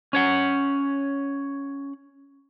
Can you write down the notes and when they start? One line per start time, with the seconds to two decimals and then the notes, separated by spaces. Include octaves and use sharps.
0.13 C#4 C#5 F#5